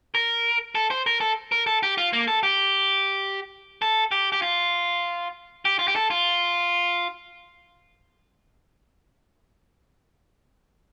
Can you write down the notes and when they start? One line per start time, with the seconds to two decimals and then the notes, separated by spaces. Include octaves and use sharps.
0.15 A#4
0.75 A4
0.91 C5
1.06 A#4
1.21 A4
1.52 A#4
1.67 A4
1.83 G4
1.98 F4
2.13 A#3
2.28 A4
2.43 G4
3.82 A4
4.12 G4
4.32 G4
4.42 F4
5.65 G4
5.79 F4
5.88 G4
5.96 A4
6.10 F4